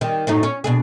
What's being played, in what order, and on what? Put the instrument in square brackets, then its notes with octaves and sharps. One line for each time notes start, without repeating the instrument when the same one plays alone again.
[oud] D#3 G3
F#2 A2 D#4
C#4
B2 D4 G#4